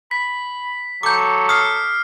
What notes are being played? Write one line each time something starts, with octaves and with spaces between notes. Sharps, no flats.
B5 B6
F#3 A4 D6 G6
D#6 F6 C7